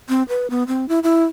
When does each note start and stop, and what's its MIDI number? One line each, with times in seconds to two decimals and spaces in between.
0.09 0.23 60
0.29 0.47 71
0.50 0.63 59
0.67 0.88 60
0.89 0.99 64
1.03 1.24 64